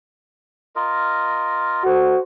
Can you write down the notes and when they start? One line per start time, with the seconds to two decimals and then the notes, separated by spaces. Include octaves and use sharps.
0.76 F4 A#4 D#5
1.84 F#4 A4 C5